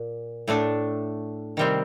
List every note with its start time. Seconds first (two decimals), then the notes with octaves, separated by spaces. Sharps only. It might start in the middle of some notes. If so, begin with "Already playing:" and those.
Already playing: A#2
0.48 A2 A3 D4 A4
1.57 C3 D#3 G3 C4